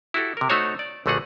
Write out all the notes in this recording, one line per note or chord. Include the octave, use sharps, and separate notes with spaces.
E4 F#4 G4 A4
C3 A#4
A3 D#4 F#4 C5 C#5 E5
D5
A#1 D3 A3 F#4 G#4 F#5